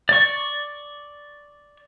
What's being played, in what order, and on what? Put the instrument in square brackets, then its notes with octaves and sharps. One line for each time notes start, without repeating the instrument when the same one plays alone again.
[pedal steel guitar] D5 C#6